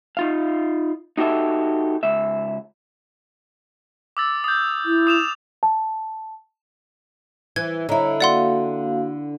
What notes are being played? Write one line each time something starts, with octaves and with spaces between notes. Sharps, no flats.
D#4 F4 F5
D#4 F#4 G4 A4 E5
C#2 E5
D6 E6 A6
D#6 G6
E4
D#6 E7 F7
A5
E3 G#6
D3 E4 C#5 D#5 A#5
A#3 F#4 D5 F5 F#5 C6